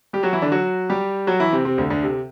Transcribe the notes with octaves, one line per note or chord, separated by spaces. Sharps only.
G3 G4
F#3 F#4
E3 E4
D3 D4
F#3 F#4
G3 G4
F#3 F#4
E3 E4
C3 C4
C3 C4
D2 D3
D2 D3
C3